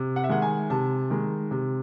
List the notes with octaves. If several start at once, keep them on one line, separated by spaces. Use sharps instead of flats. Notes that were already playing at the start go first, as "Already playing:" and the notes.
Already playing: C3
F#5
E5
D#3 G#3 F#5
G#5
C3 A5
D#3 G#3
C3